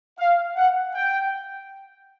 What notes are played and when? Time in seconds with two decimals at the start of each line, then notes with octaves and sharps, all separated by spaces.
0.19 F5
0.56 F#5
0.95 G5